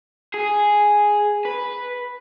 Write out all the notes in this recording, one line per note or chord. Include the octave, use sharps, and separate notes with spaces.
G#4
B4